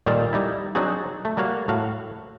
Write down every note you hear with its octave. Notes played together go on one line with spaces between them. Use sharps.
A#2 D#3 G3 A4 D5 F5
G3 D#4 E4
F#3 C4 D4 D#4 F#4 G#4
A3
G3 A#3 F#4 C#5 F5
A2 F#4 F5